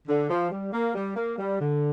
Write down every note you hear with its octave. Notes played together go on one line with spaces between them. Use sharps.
D3
F3
G3
A#3
G3
A#3
G3
D3